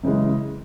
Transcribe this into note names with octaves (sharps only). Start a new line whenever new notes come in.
F#2 C#3 E3 G#3